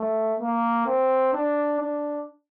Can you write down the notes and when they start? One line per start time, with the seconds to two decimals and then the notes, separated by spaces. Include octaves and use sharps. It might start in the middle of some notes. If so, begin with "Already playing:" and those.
Already playing: A3
0.40 A#3
0.86 C4
1.33 D4
1.80 D4